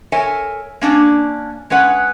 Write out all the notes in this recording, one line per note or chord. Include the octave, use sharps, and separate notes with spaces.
A4 A#4 C#5 E5 G#5
A#3 C#4 D4
G#3 C#4 B4 F#5